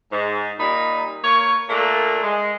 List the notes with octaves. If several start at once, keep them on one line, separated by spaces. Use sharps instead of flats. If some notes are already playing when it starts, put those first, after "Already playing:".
G#2
A#2 G3 D#4 B5
A#3 B4 C#5
A#2 A3 A#3 D4
G#3